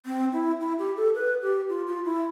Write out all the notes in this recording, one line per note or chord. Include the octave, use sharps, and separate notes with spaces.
C4
E4
E4
G4
A4
B4
G4
F4
F4
E4